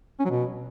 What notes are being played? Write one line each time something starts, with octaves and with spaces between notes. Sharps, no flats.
C#4
F#3
B2